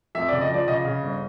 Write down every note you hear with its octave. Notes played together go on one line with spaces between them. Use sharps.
F2 E5
C#3 D5
D#5
F3 D5
C#3 D#5
C#3
G1